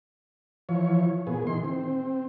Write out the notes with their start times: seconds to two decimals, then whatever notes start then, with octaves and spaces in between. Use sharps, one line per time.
0.69 E3 F3 C#5
1.27 A#2 B3 G#4
1.47 D#3 E3 C6
1.64 C4